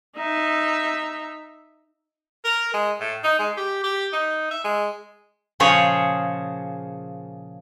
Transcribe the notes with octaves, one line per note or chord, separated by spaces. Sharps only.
D#4 E5
A#4
G#3
A2
D#4
G#3
G4
G4
D#4
E5
G#3
A#2 C#3 F3 G#4 C5 C#5